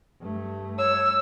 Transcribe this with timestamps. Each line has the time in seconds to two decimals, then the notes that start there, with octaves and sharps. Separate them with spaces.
0.20 G2 A3
0.78 C#5 E6